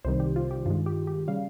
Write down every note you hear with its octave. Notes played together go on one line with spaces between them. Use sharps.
C2 C3 D#3 G3 C5
G4
F4
G4
G2 D#3 G#3 F4
G4
G4
C#3 G3 F5